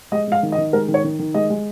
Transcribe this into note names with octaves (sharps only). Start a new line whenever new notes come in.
G#3 D#5
G#3 F5
D#3
D#5
D#3
G#3 A#4
D#3
C#5
D#3
D#3
G#3 D#5
G#3